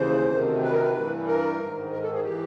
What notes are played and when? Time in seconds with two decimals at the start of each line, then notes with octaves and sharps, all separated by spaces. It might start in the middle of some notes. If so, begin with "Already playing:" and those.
Already playing: D#2 C#3 E3 C5
0.30 D2 C3 D#3
0.63 B4
0.72 A#4
0.81 B4
0.95 G2 E3
1.27 A#4
1.59 G#2 D#3
1.91 A#4
2.02 A4
2.13 G#4
2.23 E3 G4